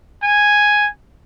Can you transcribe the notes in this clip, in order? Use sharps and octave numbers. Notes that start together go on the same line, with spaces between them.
G#5